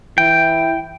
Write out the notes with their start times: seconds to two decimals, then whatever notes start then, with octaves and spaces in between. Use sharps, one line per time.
0.18 E3 E4 G5